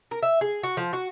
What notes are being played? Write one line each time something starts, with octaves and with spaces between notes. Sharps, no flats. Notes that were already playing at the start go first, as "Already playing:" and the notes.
A#4
E5
G#4
F#4
F3
F#4